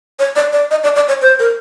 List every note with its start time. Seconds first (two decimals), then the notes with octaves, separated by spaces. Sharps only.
0.19 C#5
0.36 D5
0.53 D5
0.71 D#5
0.83 D5
0.96 D5
1.08 C#5
1.22 C5
1.40 A#4